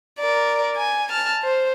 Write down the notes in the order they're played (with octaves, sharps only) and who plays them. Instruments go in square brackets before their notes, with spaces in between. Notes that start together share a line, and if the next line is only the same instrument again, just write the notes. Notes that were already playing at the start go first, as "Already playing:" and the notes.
[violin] A#4 D5
G#5
A5 F6
C5